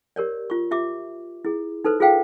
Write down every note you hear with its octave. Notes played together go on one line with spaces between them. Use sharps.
G4 A#4 C#5 D5
F4 C#6
F4 G4 E5 D6
E4 G#4
D#4 A4 B4 C5
F4 G#4 C5 F5 G5